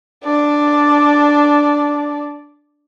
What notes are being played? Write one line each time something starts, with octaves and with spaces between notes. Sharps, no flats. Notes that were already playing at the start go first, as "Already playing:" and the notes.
D4 D5